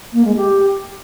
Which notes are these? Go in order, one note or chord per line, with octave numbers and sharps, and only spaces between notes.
A#3
G#3
G4